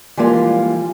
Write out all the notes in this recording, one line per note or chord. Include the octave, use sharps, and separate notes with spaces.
E3 F3 G3 G#3 A#3 F4